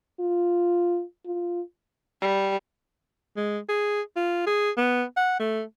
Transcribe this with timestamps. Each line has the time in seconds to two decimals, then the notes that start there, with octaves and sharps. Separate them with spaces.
0.20 F4
1.26 F4
2.21 G3
3.37 G#3
3.69 G#4
4.16 F4
4.47 G#4
4.77 B3
5.17 F#5
5.40 A3